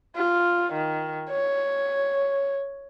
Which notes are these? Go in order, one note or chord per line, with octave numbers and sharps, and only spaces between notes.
F4
D#3
C#5